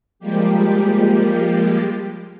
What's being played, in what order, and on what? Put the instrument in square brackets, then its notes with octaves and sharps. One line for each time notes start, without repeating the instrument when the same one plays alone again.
[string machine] F3 G3 G#3 A#3 G4